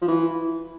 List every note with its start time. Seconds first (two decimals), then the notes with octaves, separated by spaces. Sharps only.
0.02 F3
0.08 E3